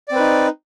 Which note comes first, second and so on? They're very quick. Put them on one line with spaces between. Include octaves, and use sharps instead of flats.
D5 C4 B4 D#4